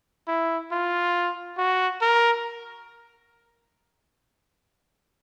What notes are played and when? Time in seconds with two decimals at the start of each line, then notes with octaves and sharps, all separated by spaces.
0.28 E4
0.72 F4
1.58 F#4
2.01 A#4